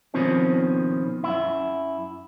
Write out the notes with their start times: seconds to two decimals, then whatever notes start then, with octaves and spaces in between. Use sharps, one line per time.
0.14 B2 D#3 F3 C4 C#4
1.24 F#2 E4